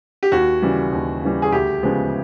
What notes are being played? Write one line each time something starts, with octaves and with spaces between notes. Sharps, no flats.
G4
D#2 F#4
C#3 E3 G3
D#2
C#3 E3 G3
G#4
D2 G4
C#3 F3 G#3 B3